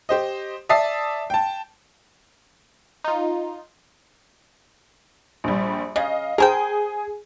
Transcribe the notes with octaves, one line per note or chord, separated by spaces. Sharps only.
G4 C5 D#5
D5 E5 A5 D#6 C7
G5 A5
D#4 F4
A#1 G3
C#3 D#5 F5
G#4 A#4 C5 G5 G#5